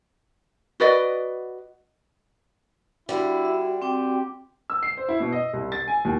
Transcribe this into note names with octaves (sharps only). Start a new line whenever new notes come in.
F#4 B4 D5 D#5
D3 G3 D4 E4 F#4
E5
C4 G4 G5 D6
E6
C7
C5
E4
B2
D#5
C2
A6
G#5
D#2